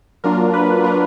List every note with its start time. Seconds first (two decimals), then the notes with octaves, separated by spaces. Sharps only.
0.24 F#3 A#3 D4 F4 A#4
0.54 B4
0.84 F#3 A#3 D4 F4 A#4